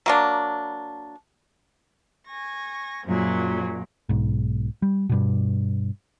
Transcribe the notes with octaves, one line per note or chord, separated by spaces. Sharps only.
F#3 A#3 D4
G#5 C#6 A#6
F#2 A#2 F3 F#3 G#4
B1 G#2
G3
G2 B2